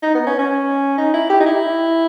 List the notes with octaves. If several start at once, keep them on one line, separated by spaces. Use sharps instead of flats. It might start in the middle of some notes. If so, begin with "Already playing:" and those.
D#4
B3
C#4
C#4
D#4
E4
G4
D#4
E4